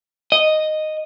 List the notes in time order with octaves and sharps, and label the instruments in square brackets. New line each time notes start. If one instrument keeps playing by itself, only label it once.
[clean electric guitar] D#5